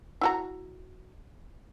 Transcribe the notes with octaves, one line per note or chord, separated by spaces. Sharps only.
E4 F#4 A#5